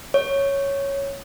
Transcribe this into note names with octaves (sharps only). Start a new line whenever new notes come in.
C#5